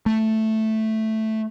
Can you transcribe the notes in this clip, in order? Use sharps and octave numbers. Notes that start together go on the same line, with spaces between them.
A3